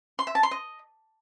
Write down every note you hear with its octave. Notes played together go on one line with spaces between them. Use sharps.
C6
E5
A5
C6
D#5